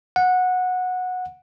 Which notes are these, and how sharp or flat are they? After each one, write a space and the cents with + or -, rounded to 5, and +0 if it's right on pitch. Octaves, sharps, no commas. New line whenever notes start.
F#5 -15